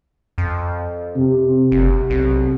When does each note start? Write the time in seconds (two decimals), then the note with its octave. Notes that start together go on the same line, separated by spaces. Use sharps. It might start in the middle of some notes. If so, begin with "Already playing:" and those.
0.38 F2
1.16 C3
1.72 F#1 C3
2.10 B1